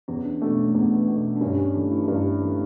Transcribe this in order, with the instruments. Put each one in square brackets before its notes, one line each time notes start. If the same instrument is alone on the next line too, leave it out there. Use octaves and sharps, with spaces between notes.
[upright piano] E2 [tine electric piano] C#4
[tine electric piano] D4
[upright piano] B2 A3 [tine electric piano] D4
[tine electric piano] C#4
A3
[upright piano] E2 [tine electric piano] B3
[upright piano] B2 A3
[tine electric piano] D4
[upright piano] G2 [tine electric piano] C#4
[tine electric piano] D4
C#4
[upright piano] E3 A3 [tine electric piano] D4
[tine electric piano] E4
[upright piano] G2 [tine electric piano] D4
[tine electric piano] E4
[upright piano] E3 A3